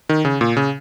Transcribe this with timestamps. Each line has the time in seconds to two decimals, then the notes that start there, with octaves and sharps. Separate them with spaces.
0.09 D#3
0.25 C#3
0.41 A#2
0.57 C#3